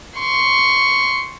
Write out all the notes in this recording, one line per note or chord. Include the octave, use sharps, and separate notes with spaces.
C6 C#6